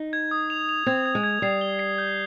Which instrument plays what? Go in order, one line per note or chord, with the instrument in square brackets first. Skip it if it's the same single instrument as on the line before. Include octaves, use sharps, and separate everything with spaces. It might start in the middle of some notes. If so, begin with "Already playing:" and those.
Already playing: [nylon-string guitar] D#4
[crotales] G#6
D#6
F7
F7
[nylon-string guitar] C4 [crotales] G#6
[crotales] G#6
[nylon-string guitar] G#3
[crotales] G#6
[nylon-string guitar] G3 [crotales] C7
[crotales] G7
C7
G6